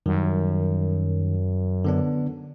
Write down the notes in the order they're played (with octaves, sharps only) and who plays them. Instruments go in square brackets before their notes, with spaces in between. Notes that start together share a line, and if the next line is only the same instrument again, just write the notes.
[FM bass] F#2 [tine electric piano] D#3 G3
[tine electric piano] D3 B3 D4